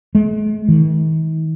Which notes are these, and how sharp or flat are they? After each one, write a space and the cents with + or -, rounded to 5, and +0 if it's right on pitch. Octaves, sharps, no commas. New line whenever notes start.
G#3 +40
D#3 +45